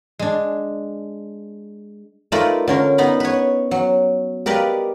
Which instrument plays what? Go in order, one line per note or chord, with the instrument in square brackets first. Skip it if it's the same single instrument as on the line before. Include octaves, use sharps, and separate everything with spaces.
[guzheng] G#3 D4
A3 D#4 F4 A#4 B4 D5
D3 C#4 A#4
B3 D#4 B5
B4 C#5
F#3
G4 A#4 B4 D5 D#5 F5